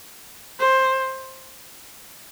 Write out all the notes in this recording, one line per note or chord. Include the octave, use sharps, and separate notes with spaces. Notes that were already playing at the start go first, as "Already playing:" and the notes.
C5